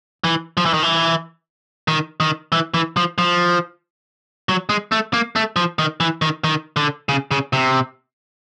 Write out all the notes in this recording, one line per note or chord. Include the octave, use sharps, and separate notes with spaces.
E3
F3
E3
D#3
E3
D#3
D#3
E3
E3
F3
F3
F#3
G#3
A3
A#3
A3
F3
D#3
E3
D#3
D#3
D3
C#3
C#3
C3